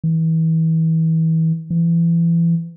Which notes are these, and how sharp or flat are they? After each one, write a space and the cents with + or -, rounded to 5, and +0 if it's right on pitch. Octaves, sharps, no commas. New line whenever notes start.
E3 -35
E3 +30